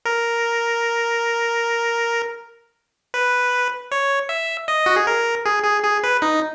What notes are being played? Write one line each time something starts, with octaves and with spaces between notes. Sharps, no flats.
A#4
B4
C#5
E5
D#5
F#4
G#4
A#4
G#4
G#4
G#4
B4
D#4